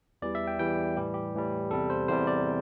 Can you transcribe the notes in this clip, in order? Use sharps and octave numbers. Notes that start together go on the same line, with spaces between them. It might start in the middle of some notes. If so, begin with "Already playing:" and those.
E2 E3 G3 D5
E5
G5
E2 E3 G3 G5
A2 E3 G3 G4
G4
A2 E3 G3
E2 C3 G3 A4
C5
E2 C3 G3 C5
D5